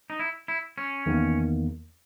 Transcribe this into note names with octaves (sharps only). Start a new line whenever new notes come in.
D#4
E4
E4
C#4
E2 D#3 A#3